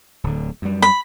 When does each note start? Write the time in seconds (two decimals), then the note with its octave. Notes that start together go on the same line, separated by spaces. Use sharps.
0.24 D1 D3
0.62 F#2 G3
0.82 B5